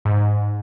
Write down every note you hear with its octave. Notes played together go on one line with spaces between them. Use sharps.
G#2